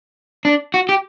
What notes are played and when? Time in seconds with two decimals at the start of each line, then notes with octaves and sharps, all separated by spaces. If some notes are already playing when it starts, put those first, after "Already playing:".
0.45 D4
0.74 F#4
0.89 G4